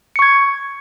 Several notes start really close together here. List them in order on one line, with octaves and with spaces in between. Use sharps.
C#7 C#6 G#6